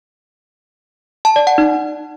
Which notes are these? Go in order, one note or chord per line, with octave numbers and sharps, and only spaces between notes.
A5
D5
F#5
D#4